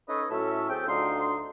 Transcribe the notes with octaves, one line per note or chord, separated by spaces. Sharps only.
C#4 D#4 A4 B4 C#5 D#5
A2 F#3 C#4 A4 E5
C4 G#4 A4 G5
D2 D4 D#4 F4 C6